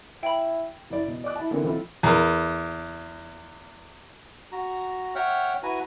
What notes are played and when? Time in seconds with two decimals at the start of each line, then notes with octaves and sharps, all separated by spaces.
0.23 E4 G5 B5
0.90 F#1 E4 D5
1.08 B2
1.24 D5 D#5 D6 F#6
1.36 E4 A5
1.51 D3 E3 A#3 C4
1.63 B1 C4 E4 F4 A4
2.03 E2 A#4
4.52 F#4 A#5
5.15 C#5 E5 F#5 G5 F6
5.63 E4 F#4 B4 G#5 A#5